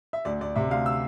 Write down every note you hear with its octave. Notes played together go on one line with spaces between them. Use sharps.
E5
D2 D5
D2 D5
C3 E5
D2 F5
E6